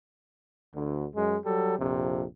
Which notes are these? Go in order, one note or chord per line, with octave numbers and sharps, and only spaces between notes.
D2
F#2 G#3
F#3 G3 A4
A#1 F2 C3